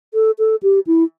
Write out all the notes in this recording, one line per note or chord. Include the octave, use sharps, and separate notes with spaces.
A4
A4
G4
E4